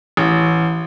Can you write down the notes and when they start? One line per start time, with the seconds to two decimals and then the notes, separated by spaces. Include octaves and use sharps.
0.17 A1